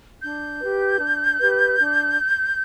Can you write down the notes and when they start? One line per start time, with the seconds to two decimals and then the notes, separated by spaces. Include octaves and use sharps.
0.23 D4 G6
0.61 G4 B4
1.00 D4
1.39 G4 B4
1.78 D4